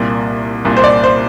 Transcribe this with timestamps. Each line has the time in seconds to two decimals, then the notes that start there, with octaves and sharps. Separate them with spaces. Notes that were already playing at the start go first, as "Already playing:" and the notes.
Already playing: C2 A#2
0.65 C2 A#2
0.77 C5
0.84 D5
1.04 C5